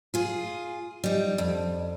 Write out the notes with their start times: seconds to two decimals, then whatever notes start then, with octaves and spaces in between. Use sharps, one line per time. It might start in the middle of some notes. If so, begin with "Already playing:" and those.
0.14 F4 G#4
1.04 G3 D#4
1.38 F2